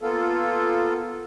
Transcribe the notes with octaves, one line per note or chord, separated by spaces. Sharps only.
A#3 B3 F4 A4